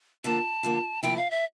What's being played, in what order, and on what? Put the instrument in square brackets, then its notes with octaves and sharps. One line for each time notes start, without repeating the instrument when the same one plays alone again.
[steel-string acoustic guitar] D3 F3 A#3 [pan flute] A5
[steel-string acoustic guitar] D3 F3 A#3
[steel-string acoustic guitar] D2 C3 F3 A#3 E4 [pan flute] G5
[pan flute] F5
E5